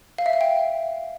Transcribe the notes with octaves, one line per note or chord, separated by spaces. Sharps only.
F5
E5
F5
G5